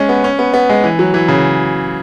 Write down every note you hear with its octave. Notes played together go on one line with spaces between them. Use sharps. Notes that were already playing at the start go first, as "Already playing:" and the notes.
Already playing: G#3 C#4
B3
C#4
B3
B3
G#3
E3
F#3
E3
C#3